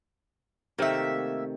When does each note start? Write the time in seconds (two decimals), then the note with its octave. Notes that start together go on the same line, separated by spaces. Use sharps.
0.79 C3 D#3 A3 A#3 E5